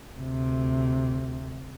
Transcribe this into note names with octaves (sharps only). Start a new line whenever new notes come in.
D2 C3